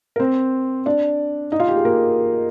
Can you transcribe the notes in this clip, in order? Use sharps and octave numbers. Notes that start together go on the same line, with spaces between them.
A#4
C4 C5
D4 D5
D#4 D#5
F4 F5
G4
G#4
A#3 A#4